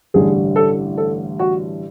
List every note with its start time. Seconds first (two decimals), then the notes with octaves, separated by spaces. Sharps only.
0.14 A1 G2 D3 G3 G#4
0.56 A4
0.97 A4
1.39 F#4